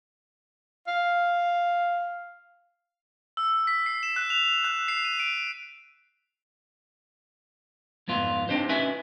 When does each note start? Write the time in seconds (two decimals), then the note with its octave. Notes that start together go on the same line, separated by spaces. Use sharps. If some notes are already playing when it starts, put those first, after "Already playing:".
0.88 F5
3.37 E6
3.67 B6
3.86 C7
4.03 E7
4.16 F#6
4.30 F7
4.45 F7
4.64 F#6
4.88 C7
5.05 D#7
5.20 D7
8.08 F2 G#2 B3 F4
8.49 C4 D4 D#4 G4 C5
8.69 C#4 E4 F#4 B4 E5 G#5